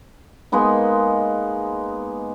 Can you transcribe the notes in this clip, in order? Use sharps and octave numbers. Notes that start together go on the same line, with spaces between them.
G#3 A#3 B3 D#4